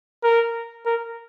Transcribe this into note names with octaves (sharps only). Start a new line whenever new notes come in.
A#4
A#4